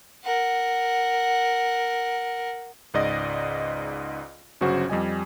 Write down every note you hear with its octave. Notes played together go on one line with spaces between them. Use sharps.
A#4 F#5
C#2 G#2 D5 D#5 D#6 A#6
G1 C#3 F#3 C#4 F#4 C5
F2 G3 D#5 G#5